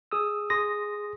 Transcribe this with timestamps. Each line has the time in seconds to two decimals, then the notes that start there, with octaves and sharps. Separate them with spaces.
0.12 G#4 D#6 E6
0.50 G#4 C6 D#6 A#6